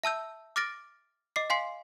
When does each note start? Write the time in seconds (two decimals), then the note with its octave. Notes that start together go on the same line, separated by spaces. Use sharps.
0.03 E5 A5 E6 G6
0.56 D6 F6 A6 A#6 D7
1.36 D#5 D6 C7
1.50 F5 G#5 C6 C7